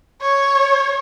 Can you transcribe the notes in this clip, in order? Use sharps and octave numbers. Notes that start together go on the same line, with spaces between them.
C#5